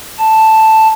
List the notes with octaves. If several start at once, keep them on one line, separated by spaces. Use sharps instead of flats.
A5